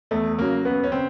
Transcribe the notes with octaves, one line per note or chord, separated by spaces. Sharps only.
E2 A3
C#3 F#3 A#3
F#2 B3
C#4
C#3 C4